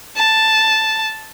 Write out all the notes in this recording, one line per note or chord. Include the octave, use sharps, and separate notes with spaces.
A5